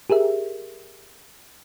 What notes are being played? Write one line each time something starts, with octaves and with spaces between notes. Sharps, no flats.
G4 G#4 A#4 E5